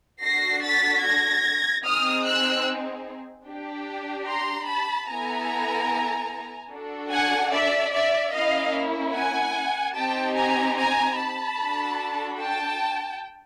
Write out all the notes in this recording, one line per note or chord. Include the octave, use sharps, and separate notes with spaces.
D4 F#4 A4 A#6 C7
A6 B6
G#6 A#6
C4 D#4 G#4 D#6 F6
E6 F#6
D4 G4
A#5 C6
A5 B5
B3 E4 A4 G#5 A#5
D4 F#4 A4
F#5 G#5
D5 E5
D5 E5
A#3 C#4 E4 D#5 F5
F#5 G#5
C4 D#4 G4 G5 A5
G#5 A#5
G#5 A#5
A5 B5
D4 F#4 A4
G5 A5